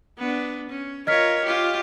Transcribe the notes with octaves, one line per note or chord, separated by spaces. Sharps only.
B3 D4
C#4
F4 A#4 C#5 D#5 F6 B6
F4 G4